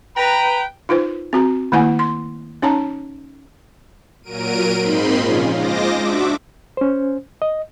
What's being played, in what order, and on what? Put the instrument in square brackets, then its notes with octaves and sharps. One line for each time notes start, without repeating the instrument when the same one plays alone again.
[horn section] B4 A#5 [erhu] G5
[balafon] D#4 F4 B4 C5
C4 F#4 A#5
D#3 A3 A#3 E4 F#5 G#5
C6
C#4 D#4 C#5 A5 A#5
[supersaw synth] A#2 F#3 A#4 D7 D#7
G#2 A#3 C4 D#4 B5 C6
A#2 C#3 F3 C#4 F4 G#4
G#3 F4 C5 D#5 D6 A#6
D4 F#4 E5 D6
[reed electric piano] C#4 C5
D#5